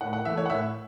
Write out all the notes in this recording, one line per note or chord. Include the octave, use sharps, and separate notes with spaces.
A2 F#5
F#5
E3 A3 E5
C#5
F#5
A2 E5